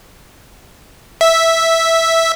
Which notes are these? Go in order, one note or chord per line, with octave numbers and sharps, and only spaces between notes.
E5